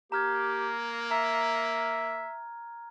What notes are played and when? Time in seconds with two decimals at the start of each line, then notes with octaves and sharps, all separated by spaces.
0.12 A#3 G4 A#5 F6 G#6
1.11 E5 A#5